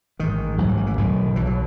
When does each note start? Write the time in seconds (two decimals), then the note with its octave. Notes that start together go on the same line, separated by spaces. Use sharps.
0.19 A1 G#2 D#3
0.58 A1 G#2 F#3
0.68 E3
0.77 D#3
0.87 E3
0.97 B1 B2 D#3
1.36 B1 B2 E3
1.46 F#3